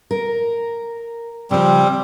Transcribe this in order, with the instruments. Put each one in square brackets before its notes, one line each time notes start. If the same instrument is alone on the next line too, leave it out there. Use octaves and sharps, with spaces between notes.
[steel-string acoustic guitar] A#4
[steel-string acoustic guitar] C#3 F3 [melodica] G3 C4